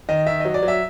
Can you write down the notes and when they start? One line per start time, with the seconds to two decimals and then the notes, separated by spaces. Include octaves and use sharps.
0.09 D#3 D#5
0.27 D#3 E5
0.40 F#3 D#5
0.54 D5
0.63 F#3
0.68 E5